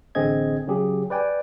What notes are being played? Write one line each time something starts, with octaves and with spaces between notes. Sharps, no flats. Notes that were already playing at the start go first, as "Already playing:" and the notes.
A1 D3 C4 G#4 D#5 G#6
C#3 F#3 G4 G#4
B4 D5 G5 G#5